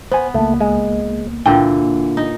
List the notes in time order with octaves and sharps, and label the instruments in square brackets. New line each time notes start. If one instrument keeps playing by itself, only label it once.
[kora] B3 [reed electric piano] C5 G#5
[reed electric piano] C#2 A#3 [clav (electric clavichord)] A3
[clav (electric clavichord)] G#3
[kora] A#2 D3 E3 [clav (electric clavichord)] G5
[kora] D#4